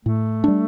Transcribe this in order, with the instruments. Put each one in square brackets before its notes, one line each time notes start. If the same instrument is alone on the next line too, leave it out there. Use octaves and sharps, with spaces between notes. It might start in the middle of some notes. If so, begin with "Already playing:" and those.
[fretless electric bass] A2 [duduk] A3
[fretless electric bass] G3 D4